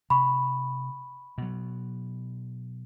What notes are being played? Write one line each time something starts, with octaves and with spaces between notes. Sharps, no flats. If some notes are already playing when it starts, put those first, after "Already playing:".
C3 B5 C#6
B2 F#3